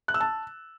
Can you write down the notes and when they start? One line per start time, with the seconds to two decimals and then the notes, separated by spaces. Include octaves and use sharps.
0.08 F#6
0.14 E6
0.20 A5